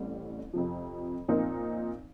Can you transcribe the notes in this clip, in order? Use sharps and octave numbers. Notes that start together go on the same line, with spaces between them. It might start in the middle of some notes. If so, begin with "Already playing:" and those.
Already playing: A1 A2 G3 C4
F2 C3 F3
A#2 F3 C4 D#4 A#4